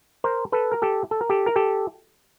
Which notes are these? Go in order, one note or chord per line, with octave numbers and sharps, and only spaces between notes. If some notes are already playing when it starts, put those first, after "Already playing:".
A#4 C5
A4 B4
A#4
G4 A4
A4
A#4
G4 A4
A#4
G4 A4